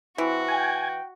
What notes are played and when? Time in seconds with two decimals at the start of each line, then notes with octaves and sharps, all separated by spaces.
0.18 E3 C4 F#4
0.48 G5 G#5